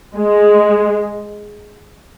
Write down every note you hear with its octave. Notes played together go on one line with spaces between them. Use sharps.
G#3